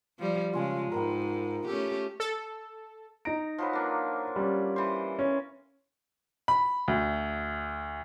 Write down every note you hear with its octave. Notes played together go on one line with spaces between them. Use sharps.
F3 G3
C#3 G#3 F4 G#5 A5
G#2 A#4 B4 G5
A3 C#4 G4 A4
A4
D#4 A#5 D7
F3 F#3 B4
A#3 D4
G3 C#4
E3 C5
C#4
B5
D2